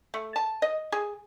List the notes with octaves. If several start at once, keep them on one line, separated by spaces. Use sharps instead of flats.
A3
A5
D#5
G#4